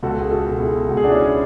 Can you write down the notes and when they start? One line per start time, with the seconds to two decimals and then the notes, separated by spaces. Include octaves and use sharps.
0.03 C#2 F#4 A4
0.21 G#4
0.31 F#4 A4
0.47 B2
0.61 E4 G#4
0.89 C#2 F#4
0.97 G#4
1.04 D4 F#4
1.11 C#4 E4